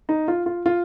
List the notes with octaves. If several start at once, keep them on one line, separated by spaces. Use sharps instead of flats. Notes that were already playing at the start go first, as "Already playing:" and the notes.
D#4
F4
F4
F4